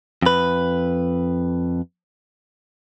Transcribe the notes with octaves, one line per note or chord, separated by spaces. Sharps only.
F2 B4